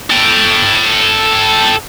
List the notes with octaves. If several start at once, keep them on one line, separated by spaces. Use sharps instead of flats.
A4 G5